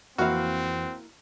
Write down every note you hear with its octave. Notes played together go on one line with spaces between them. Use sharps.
F2 E3 A#3 C4 E4 F#4 F5